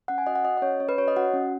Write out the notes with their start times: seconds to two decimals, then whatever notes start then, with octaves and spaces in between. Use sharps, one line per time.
0.08 C#4 F#5
0.18 G#5
0.26 F#4 D#5
0.35 F#5
0.45 F#4 D#5
0.57 D#5
0.62 C#4 C#5
0.80 C#4 C#5
0.89 B4
0.98 F#4 C#5
1.08 D#5
1.17 F#4 F#5
1.34 C#4